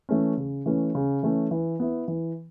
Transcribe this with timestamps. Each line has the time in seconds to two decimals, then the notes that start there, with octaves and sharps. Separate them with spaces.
0.09 E3 A3 C#4
0.37 C#3
0.66 E3 A3 C#4
0.95 C#3
1.23 E3 A3 C#4
1.51 E3
1.80 B3 E4
2.08 E3